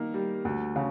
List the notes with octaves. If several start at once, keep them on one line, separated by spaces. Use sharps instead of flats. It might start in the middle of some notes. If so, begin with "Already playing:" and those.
Already playing: D#3 A#3
G3
D2
C#3